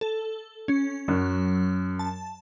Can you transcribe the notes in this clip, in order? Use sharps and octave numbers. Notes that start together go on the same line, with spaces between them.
A4
C#4
F#2 F#3
A5